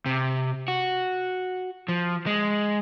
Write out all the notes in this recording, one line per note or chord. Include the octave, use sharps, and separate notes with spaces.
C3
F#4
F3
G#3